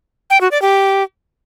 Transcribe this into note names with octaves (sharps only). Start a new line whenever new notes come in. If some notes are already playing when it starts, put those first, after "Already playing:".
G5
F#4
D5
G4